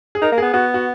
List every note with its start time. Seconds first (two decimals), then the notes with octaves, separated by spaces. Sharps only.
0.15 G#4
0.22 D#4 A#4
0.32 A#3
0.38 B3 G#4
0.54 B3 F#4
0.74 F#4